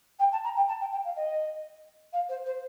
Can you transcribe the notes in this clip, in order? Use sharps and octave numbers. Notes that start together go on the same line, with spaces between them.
G5
A5
A#5
G5
A5
G5
G5
F5
D#5
F5
C5
C5